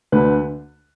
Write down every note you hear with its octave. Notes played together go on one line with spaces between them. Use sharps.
D2 D3 B4